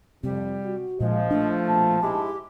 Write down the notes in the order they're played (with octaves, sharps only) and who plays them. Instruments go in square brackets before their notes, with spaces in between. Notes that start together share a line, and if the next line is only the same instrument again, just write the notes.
[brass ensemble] F2 [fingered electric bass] C3 [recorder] G3
[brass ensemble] F#4
[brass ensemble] A#1 D#5 [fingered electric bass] A#2 [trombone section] F3 [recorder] G#3
[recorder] A3 [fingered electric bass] D4
[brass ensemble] A#1 B2 A5
[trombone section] G#2 G#3 E4 [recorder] G4